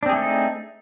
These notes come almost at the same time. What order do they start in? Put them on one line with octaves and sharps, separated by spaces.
D4 C4 G#4 A3 D#4